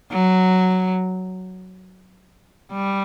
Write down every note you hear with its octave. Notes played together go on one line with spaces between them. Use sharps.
F#3
G3